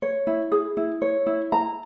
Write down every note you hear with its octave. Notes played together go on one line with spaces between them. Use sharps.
C#5
E4
G#4
E4
C#5
E4
A#5